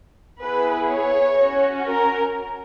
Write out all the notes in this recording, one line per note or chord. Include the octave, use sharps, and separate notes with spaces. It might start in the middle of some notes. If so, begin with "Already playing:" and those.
B3 E4 G#4 B4
C#5
C#4 F#4
A#4